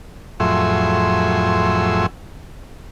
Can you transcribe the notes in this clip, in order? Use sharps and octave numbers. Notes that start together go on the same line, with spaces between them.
F2 A2 F#3 G#4 E5 C6